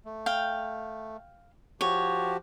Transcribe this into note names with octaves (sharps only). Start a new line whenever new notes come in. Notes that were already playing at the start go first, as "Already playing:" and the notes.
A3
F5 G5
F3 F#4 G4 C#5